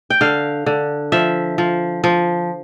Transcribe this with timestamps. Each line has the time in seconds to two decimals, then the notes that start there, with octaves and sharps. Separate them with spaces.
0.10 G5
0.21 D3 F5
0.66 D3
1.12 F3 E5
1.58 F3
2.04 F3